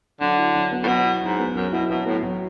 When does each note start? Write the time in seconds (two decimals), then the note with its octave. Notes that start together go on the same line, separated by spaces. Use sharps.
0.21 D3 F#3
0.38 E4
0.55 F#3
0.72 B3
0.84 A2
0.88 B2 F#3
1.05 E4
1.22 G#2 F#3
1.39 B3
1.55 F#2 F#3
1.73 B2 E4
1.89 B2 F#3
2.06 A2 B3
2.23 F#3